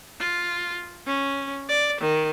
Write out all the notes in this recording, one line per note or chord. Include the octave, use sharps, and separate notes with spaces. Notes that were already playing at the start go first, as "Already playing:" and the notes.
F4
C#4
D5
D#3